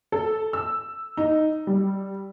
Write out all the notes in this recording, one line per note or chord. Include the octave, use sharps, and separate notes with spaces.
A4
E6
D#4
G3